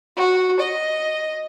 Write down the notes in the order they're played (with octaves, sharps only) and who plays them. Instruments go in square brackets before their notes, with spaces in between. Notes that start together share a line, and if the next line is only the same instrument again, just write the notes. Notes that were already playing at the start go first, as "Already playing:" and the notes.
[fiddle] F#4
D#5